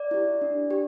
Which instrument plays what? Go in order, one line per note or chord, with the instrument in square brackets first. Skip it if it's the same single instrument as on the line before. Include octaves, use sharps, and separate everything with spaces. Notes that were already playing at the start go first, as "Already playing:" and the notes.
Already playing: [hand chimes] D5
E4 G4
D4
G4